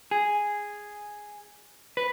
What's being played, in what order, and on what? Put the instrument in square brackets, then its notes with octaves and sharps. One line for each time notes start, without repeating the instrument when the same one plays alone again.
[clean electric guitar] G#4
B4